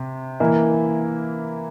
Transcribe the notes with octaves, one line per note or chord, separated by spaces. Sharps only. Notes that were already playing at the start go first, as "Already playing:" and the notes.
Already playing: C3
E3 A#3 E4